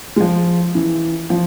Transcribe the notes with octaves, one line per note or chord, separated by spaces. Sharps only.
G#3
F3
E3
F3